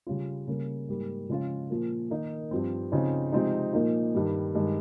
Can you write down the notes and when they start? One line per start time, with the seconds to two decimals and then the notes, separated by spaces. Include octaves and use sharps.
0.07 C#3 G3 C#4 F4
0.47 C#3 G3 A#3
0.89 G#2 G3 A#3
1.29 C#3 F3 G#3 C#4 F4
1.70 A#2 F3 A#3
2.10 D#3 A#3 D#4
2.51 G2 F3 C4
2.92 C#3 F3 C4 D#4
3.33 C3 F3 G#3 C4 D#4
3.73 A#2 F3 A#3 D#4
4.15 G2 D#3 G3
4.55 G2 D#3 G#3